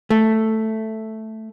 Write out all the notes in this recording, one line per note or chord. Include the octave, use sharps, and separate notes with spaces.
A3